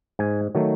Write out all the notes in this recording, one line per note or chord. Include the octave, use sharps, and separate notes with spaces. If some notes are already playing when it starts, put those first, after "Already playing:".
G#2 G#5
D#3 F#3 A3